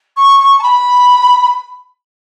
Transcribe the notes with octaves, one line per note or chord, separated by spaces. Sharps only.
C#6
C#6
A5
B5